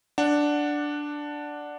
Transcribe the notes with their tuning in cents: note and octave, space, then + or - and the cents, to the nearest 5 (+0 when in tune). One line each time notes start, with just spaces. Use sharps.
D4 +0 F#5 +0